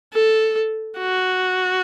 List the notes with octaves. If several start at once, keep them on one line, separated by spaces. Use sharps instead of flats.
A4
F#4